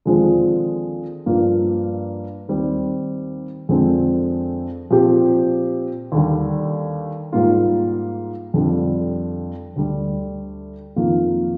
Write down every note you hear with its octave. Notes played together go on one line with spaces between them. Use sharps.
D#2 D3 F3 G#3 C4
G2 F3 A#3 F4
D#2 D#3 G3 C4
F2 D3 G#3 C4
A#2 F3 C4 G4
D#2 D3 G3
G#2 G3 A#3 F4
F2 D3 G3
D2 D3 G3
F2 D#3 A#3 F4